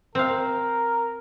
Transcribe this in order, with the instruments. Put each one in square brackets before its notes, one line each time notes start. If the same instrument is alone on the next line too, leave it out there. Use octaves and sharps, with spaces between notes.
[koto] C4 F5 [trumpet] A#4